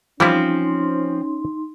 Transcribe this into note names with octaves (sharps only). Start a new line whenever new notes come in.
E3 F3 G3 C4 C#4 D#4 E4 C6